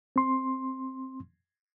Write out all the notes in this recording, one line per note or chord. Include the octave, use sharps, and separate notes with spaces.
C4 C6